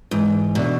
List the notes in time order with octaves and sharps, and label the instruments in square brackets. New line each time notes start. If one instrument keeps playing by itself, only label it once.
[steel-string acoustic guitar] G#2 [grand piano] E3
[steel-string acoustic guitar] B2 [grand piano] A3 D4